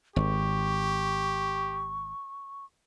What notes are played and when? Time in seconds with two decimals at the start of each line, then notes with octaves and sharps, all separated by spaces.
0.16 G#1 G4 C#6